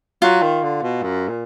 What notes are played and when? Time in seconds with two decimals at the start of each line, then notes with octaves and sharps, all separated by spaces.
0.22 F#3 F4
0.42 D#3
0.63 D3
0.82 B2
1.02 F#2
1.28 A#2